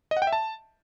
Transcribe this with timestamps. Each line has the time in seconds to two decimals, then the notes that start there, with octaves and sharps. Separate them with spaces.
0.11 D#5
0.17 F#5
0.22 G5
0.27 E5
0.33 A5